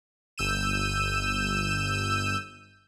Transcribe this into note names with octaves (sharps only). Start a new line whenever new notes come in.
G1 E6 G6 D#7 E7